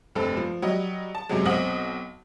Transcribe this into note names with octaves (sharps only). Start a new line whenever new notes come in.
F1 G2 C4 A4
F3
F#3 G3 D#5
A5
F#2 C3 F#3 G#3
B1 C4 D#5 F#5 D#6 F#7